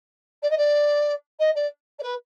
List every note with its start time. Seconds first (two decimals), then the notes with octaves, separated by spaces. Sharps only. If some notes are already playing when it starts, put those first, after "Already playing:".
0.42 D5
0.50 D#5
0.57 D5
1.39 D#5
1.55 D5
1.99 D5
2.03 B4